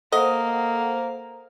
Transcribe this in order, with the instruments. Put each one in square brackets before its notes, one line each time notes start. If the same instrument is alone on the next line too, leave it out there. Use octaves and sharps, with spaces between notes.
[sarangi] A#3 [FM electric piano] A4 C5 F#5 [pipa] D#5